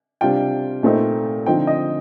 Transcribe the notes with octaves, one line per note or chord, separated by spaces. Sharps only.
C3 G3 D4 F4 G5
A#2 A3 C4 D#4
D3 F3 C4 D#4 G5
D#5